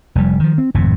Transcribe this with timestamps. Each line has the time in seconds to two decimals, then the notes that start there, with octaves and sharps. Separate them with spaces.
0.15 F1 F2 G3
0.40 D#3 F3
0.58 C4
0.74 G#1 F2 A2 C3